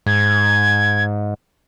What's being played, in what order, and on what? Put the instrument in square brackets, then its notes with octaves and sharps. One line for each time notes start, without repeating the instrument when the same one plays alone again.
[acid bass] G#2 [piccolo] G#6